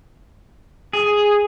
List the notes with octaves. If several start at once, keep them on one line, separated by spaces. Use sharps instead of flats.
G#4